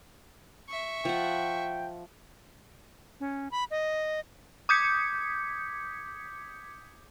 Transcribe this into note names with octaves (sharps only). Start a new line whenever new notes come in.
E5 C#6
F3 F#5 G5
C#4
B5
D#5
D6 D#6 G6 G#6 B6 C#7